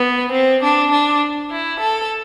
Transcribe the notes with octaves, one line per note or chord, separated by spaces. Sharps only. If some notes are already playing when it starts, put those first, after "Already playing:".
Already playing: B3
C4
D4
D4
E4
A4